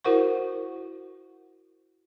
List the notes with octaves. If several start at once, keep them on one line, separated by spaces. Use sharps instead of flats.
E4 F#4 A#4 C5 F#5 C#6